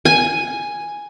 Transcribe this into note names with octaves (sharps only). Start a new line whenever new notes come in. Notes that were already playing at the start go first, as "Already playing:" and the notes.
G#5